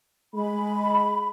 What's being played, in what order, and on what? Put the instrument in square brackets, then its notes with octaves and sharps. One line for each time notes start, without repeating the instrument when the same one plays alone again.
[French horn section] G#3 [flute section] B5